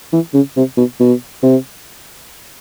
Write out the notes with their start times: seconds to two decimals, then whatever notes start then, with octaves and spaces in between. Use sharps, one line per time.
0.13 E3
0.34 C#3
0.57 C3
0.77 B2
1.00 B2
1.43 C3